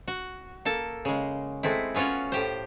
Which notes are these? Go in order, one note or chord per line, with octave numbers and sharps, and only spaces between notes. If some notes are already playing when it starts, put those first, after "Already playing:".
F#4
A#3 A4 A5
C#3 G#3
G#3 A3 C4 E4
B3 C#4 F4 F#4 C#5
A2 G4 C5